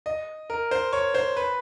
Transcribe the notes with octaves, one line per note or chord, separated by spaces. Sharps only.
D#5
A#4
C5
C#5
C5
B4